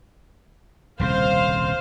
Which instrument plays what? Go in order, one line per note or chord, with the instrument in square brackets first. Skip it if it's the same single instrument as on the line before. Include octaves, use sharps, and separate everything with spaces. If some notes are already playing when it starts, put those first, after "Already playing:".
[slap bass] D#1 C2 C#3 [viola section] C5 F5